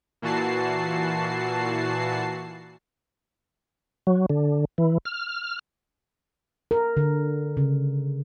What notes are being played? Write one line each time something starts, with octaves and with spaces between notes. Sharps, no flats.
A#2 E3 F#4 A5 C7
F#3
D3
E3
F6
A#4
D3
C#3